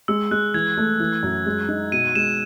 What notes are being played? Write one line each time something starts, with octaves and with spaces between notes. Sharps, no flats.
G#3 E6
G#3 F#6
E3 G#6
A3
E3
F#2
G#3
D#4
B2 D#7
G#3 E7